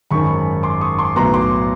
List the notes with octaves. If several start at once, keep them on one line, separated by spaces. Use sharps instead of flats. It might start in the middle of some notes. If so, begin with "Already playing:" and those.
G#1 F#2 D#3 B5 C#6
C6 D6
C#6 D#6
C6 D6
B1 A2 F#3 B3 A#5 C6
C6 D6